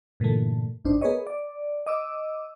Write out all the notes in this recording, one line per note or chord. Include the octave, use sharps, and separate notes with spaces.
G2 A#2 D3 E3 A3
G#1 F#2 D4 D#4 C5
B3 G#4 A#4 B4 C#5 D#5
D5
D#5 D6 E6